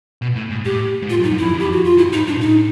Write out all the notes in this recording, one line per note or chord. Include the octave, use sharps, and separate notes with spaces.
B2
A2
G#2
A2 G4
G#2
A2 F4
F#2
D#4
F#2
F2 E4
F2
G4
F#4
F4
F#2 E4
G#2 D#4
G2 D4
A#2
A2 D#4